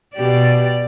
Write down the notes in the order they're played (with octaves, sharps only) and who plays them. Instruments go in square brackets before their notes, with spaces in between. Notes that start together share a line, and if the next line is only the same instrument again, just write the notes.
[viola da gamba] B2 G4 D5